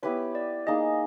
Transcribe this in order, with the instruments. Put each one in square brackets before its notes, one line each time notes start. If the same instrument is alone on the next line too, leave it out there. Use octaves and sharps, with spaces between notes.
[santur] B3 E4 G4 B4 [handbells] C#5
[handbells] D5
[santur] A#3 D#4 G#4 [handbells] D#5